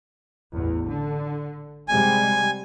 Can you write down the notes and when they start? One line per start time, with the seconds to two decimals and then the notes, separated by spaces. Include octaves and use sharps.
0.55 A1 E2
0.88 D3
1.88 C3 G3 G#3 G#5